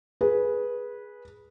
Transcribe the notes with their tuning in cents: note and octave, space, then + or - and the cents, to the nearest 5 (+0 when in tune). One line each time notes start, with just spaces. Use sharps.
G#4 +0 B4 -15